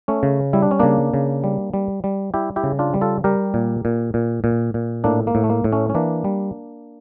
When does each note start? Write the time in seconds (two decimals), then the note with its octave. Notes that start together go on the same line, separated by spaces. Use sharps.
0.08 A3 C#4
0.23 C#3
0.53 G3 E4
0.63 D4
0.71 C#4
0.79 C#3 A#3 D4
1.14 C#3
1.44 G3
1.74 G3
2.04 G3
2.34 G3 E4 G4
2.56 E4 G4
2.64 C#3
2.79 D4 F4
2.94 G3
3.01 F4 A4
3.24 G3 G4 A#4
3.54 A#2
3.85 A#2
4.14 A#2
4.44 A#2
4.74 A#2
5.04 A2 A#3 D4
5.27 A#3
5.35 A2
5.44 A3
5.49 A#3
5.64 A2
5.72 A3 C#4
5.90 C#4
5.94 E3 A#3 D4
6.24 G3